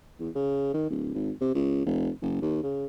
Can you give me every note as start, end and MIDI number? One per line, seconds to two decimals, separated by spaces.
0.20 0.30 40
0.35 0.69 49
0.74 0.88 51
0.90 1.13 26
1.14 1.31 32
1.41 1.53 48
1.55 1.86 37
1.86 2.09 29
2.22 2.38 30
2.41 2.61 39
2.63 2.86 49